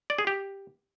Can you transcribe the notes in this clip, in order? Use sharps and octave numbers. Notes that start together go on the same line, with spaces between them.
D5
G#4
G4